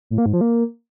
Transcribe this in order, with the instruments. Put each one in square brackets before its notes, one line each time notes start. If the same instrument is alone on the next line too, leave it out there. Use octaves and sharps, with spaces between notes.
[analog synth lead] A2
A#3
G#2
F3
A#3